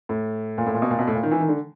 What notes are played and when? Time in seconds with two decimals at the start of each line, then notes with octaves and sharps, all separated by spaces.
0.09 A2
0.58 A#2
0.66 A2
0.74 A#2
0.82 B2
0.91 A#2
0.99 B2
1.07 A2
1.15 A#2
1.23 D#3
1.31 E3
1.40 D#3
1.48 D3